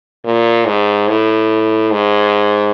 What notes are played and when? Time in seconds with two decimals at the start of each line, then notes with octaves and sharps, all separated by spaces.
0.25 A#2
0.67 G#2
1.08 A2
1.91 G#2